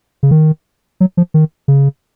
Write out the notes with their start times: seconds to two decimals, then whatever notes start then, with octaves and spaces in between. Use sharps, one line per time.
0.23 C#3
0.31 D#3
1.00 F#3
1.17 F3
1.34 D#3
1.68 C#3